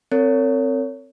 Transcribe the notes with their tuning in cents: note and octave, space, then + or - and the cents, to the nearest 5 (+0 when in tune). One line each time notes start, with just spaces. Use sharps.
C4 +0 A#4 -40 C#5 +20